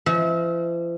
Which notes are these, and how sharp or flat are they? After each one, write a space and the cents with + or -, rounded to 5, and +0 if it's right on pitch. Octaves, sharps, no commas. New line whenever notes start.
F3 -45 E5 -35